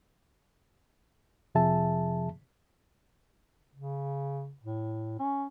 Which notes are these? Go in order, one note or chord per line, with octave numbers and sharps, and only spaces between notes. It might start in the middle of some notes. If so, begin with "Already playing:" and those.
F2 C3 F3 G#4 E5 A5
C#3
A2
C#4